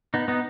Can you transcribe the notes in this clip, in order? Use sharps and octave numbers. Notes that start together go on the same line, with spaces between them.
B3 D#4
B3 D#4